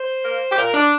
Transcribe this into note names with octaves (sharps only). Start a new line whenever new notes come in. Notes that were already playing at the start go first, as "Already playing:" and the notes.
Already playing: C5
A#3
G4
A#2 A#4
D4